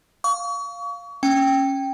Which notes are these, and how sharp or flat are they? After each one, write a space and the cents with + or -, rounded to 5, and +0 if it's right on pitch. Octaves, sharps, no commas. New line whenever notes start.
F5 +0 C#6 +35
C#4 -15 G5 +0